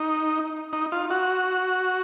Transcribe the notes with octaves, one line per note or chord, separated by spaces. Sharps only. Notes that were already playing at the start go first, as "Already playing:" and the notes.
Already playing: D#4
D#4
F4
F#4